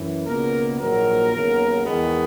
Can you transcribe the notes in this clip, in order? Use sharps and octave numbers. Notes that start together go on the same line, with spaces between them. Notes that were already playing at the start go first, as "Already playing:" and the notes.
Already playing: F#2 E3
C#2 B2 A#3 A#4
A#1 G#2 D#3 F#3 A#3 A#4
D#2 C#3 F#3 B3
E2 D#3 G#3 B3